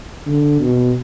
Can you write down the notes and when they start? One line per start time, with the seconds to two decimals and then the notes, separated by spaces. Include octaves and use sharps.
0.26 D3
0.60 B2